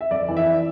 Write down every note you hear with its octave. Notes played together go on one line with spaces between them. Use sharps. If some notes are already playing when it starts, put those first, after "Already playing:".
E5
F2 D5
E3
E5